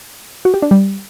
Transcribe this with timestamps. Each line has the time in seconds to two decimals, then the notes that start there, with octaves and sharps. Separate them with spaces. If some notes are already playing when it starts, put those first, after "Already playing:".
0.45 F#4
0.54 G4
0.62 D4
0.71 G3